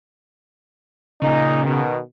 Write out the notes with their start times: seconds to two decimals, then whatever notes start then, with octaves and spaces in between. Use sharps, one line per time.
1.22 A#2 C#3 D#4
1.64 B2 D#3